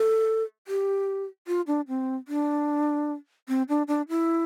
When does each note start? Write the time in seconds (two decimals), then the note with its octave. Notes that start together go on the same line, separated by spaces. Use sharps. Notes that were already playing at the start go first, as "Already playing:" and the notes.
Already playing: A4
0.68 G4
1.47 F4
1.67 D4
1.88 C4
2.28 D4
3.49 C4
3.69 D4
3.88 D4
4.09 E4